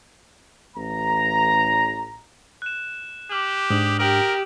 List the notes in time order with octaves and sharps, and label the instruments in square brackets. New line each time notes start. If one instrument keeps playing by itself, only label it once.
[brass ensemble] A1 A#5
[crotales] F#6 E7
[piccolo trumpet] G4 [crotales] D6 F6 F#7
[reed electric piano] G#2 D4 [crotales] D#6 F#7
[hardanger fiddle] G4 [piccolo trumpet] A#4 [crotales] F6 D7 F#7